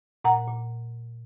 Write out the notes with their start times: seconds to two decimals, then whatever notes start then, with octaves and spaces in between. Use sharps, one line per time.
0.24 A#2 F#5 A#5
0.48 A#2